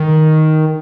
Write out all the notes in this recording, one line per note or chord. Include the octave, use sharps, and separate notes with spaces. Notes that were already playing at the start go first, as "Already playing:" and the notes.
Already playing: D#3